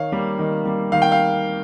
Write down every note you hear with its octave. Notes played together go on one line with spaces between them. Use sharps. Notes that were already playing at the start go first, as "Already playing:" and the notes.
Already playing: D#3 C#5 F5
G3 A#3
D#3
G3 A#3
D#3 F5
G5
F5